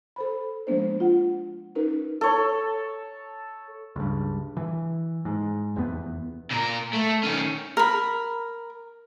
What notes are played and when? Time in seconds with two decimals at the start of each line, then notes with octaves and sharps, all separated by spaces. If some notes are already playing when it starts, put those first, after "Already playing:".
0.16 A4 C5 B5
0.67 F3 G#3 A#3 B3 D4 C5
1.00 F4 F#5
1.75 C#4 D#4 A#4 B4
2.21 A4 C#5
3.96 C#2 G2
4.57 E3
5.25 G#2
5.76 F1 E2 A#2 B3
6.51 A#2 A#4
6.93 A3
7.23 D#3 C#4
7.77 A#4 B5